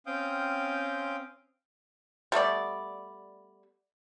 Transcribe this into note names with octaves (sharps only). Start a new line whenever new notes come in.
C4 C#4 F5 G5 D#6 G6
G3 A3 B3 D5